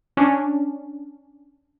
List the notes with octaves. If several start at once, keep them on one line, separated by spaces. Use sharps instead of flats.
C#4 D4